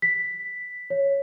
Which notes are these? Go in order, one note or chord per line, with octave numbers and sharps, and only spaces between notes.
B6
C#5